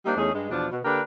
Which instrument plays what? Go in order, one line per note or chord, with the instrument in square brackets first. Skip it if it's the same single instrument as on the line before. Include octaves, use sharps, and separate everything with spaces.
[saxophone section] G3 A#3 D4 D#4 G4 C5
E2 A3 C#4 D#4 G#4
G2 G#3
E2 B2 F3 D4
B2
D3 A#3 D4 G4 A#4 B4